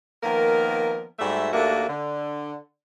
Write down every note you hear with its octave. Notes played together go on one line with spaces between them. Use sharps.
D#3 F3 A#3 B3 A#4
G#2 G3 A3 F#4 E5
D#2 A3 A#3 D4 F#4 E5
D3